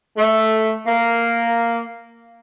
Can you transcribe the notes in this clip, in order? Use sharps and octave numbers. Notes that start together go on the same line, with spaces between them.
A3
A#3